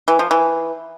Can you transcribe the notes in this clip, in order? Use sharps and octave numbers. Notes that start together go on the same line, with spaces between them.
E3
F3
E3